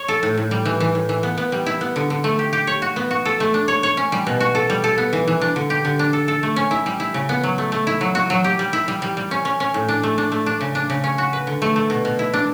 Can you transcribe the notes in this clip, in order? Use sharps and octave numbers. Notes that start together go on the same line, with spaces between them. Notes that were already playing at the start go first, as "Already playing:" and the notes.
Already playing: C#5
A4
A2
A2
G3
E3
E3
A2
E3
B3
B3
G3
E4
B3
D3
D3
A3
G4
G4
C#5
F#4
B3
F#4
A4
A3
D4
C#5
C#5
C#4
G3
B2
F#4
A4
G3
A4
B3
E3
E3
D4
D3
G4
D3
D4
A4
A4
A3
C#4
E4
G3
E4
C#3
B3
F#3
A3
A3
E4
F#3
F#4
F#3
G4
G3
E4
G3
G3
G3
C#4
C#4
C#4
A2
D4
A3
D4
A3
D4
C#3
D4
C#3
C#4
F#4
B4
D3
A3
A3
B2
B2
E4
D4